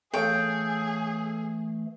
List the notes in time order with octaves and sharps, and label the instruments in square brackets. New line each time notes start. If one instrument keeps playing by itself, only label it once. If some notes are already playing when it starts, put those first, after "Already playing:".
[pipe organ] E3 A3 [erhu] G#4 [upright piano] A4 C#5 F5 [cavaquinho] G5